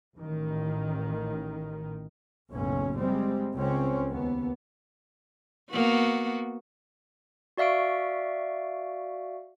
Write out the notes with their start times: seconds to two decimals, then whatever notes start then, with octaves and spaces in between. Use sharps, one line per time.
0.16 A1 D#3
2.49 F#1 B1 A2 C#4
2.97 G3 G#3 C4
3.54 C#2 C4 C#4
4.09 D#2 B3
5.71 A#3 B3 F#4
7.57 F#4 D5 E5 F5 C#6 D7